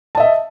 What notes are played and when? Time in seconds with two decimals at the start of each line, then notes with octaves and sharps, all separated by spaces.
0.15 A5
0.17 D#5
0.20 E5